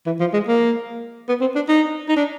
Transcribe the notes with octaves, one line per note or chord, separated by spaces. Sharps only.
E3
F3
G#3
A#3
B3
C4
D4
D#4
D#4
D4